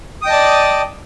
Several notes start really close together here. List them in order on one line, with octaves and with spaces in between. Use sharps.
D#6 G5 D#5 A5 D5